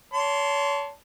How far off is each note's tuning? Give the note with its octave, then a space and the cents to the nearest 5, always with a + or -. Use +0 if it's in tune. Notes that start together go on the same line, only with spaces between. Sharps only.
C#5 +35 A5 +0 C6 -5